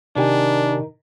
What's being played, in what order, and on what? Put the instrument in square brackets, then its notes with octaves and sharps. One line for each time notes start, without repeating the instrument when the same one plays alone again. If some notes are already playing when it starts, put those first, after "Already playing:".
[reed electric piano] C3 G4 G#5 [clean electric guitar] D#3 [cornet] D4